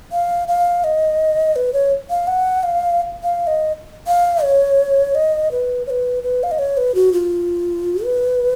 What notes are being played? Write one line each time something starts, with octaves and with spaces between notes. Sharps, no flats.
F5
F5
D#5
B4
C#5
F5
F#5
F5
F5
D#5
F5
C#5
D#5
B4
C#5
B4
B4
F5
D#5
C#5
B4
F#4
F4
B4